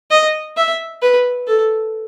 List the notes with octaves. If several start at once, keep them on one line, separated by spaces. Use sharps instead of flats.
D#5
E5
B4
A4